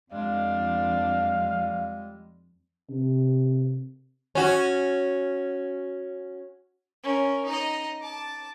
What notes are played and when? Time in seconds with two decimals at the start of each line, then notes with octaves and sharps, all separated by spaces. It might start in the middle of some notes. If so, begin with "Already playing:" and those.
0.12 F2 G3 G#3 D4 F5
2.89 C3
4.35 C#4 F#4
7.04 C#4 A#4
7.45 D#4 D#5
8.01 A5 D6